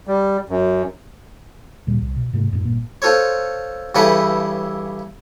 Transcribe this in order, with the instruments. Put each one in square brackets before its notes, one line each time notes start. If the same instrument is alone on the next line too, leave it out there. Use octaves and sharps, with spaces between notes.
[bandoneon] G3
F#2
[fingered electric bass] D2 A#2 G3
C2
B2
G#2 C3 A3
F#2 A2
G1 A#2 A#3
[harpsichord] F4 A4 C5 C#5
G2 C#3 E3 A4 B4 F#5